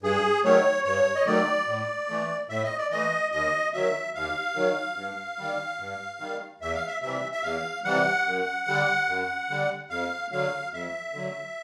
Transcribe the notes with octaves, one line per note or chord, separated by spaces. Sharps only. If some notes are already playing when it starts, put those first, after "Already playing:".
G2 G#4
D#3 F#3 A3 C#5
G2 C#5
D#5
D#3 F#3 A3 D5
A2
E3 A3
A2 E5
D#5
D5
E3 A3 D#5
D#2 D#5
D#3 F#3 E5
D#2 F5
D#3 F#3
G2
D#3 G3
G2
D#3 G3
E2 E5
F5
E5
C3 E3 G3 E5
E5
E2 F5
C3 E3 G3 F#5
F#2
D3 G3
F#2
D3 G3
F2 F5
D3 F#3 F5
F2 E5
D3 F#3